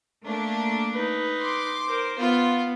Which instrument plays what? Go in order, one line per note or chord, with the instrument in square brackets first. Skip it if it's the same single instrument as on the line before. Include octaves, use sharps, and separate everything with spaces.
[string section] A3 A#3 D4
[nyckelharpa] D#4 B4
[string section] C6 D6
[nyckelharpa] A#4 C5
[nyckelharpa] B3 [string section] F4